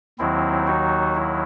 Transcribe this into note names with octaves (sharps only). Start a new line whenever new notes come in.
D#2 D#3 F#3 C4 E4
D#4 F#4
E4